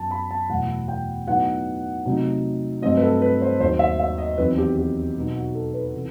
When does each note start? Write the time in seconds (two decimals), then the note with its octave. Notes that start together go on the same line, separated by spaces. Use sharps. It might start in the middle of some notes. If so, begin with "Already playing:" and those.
Already playing: F#2 F#3 B3 A5
0.11 B5
0.31 A5
0.49 E2 B2 F#3 A3 F#5
0.88 G5
1.27 A2 F#3 B3 D#4 F#5
2.06 C3 F#3 A3 D#4
2.82 G2 F#3 A3 C4 D#5
2.97 B4
3.03 A4
3.22 B4
3.42 C5
3.60 D#2 D#3 F#3 C5
3.79 E5
4.00 E5
4.18 D#5
4.38 E2 D#3 F#3 C4 B4
4.58 G4
4.77 G4
5.16 B2 F#3 B3 D#4
5.36 F#4
5.55 A4
5.74 B4
5.93 C3 E3